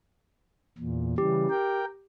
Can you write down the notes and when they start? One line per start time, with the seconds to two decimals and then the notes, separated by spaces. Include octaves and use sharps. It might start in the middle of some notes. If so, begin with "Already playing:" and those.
0.78 E2 A#2
1.18 C#3 E3 G3 G4
1.50 A#4 G5